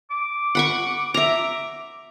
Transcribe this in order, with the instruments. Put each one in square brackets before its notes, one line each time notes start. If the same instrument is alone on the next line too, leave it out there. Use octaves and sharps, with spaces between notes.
[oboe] D6
[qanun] F#5 B5 C#6
E5 A#5